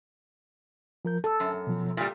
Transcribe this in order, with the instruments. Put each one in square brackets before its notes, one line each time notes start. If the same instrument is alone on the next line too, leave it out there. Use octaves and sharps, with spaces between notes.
[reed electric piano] F3 A#4 G6
[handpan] A4 [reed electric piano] A5 E6
[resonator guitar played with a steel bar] F#2
[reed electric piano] B2 F3
[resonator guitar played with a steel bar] A#2 G3